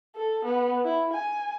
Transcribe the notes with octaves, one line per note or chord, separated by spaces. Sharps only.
A4
B3
E4
G#5